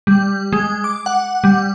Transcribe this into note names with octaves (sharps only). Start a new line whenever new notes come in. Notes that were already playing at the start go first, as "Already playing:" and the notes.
G3
G#3
D6
F#5
G3